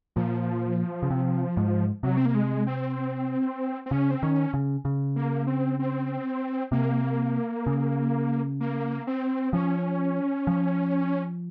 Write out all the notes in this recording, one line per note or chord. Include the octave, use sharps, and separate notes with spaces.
A#2 F3
C#3
C3
G#2
C3 F#3
C4
A#3
G#3
C4
C4
C#3 C#4
C4
D#3 C#4
C#3
C#3
A#3
C4
C4
C3 A#3
C#3
A#3
C4
F3 C#4
F3